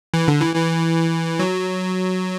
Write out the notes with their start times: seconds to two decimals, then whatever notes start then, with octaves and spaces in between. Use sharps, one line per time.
0.14 E3
0.28 D3
0.42 E3
0.55 E3
1.39 F#3